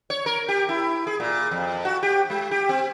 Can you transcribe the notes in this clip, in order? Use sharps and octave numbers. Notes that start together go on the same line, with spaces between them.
C#5
A#4
G4
E4
G#4
A#2
F2
F#4
G4
G#3
G4
C4